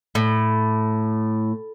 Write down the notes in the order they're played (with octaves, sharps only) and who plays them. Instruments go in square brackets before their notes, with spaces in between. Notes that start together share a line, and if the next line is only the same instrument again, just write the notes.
[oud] A2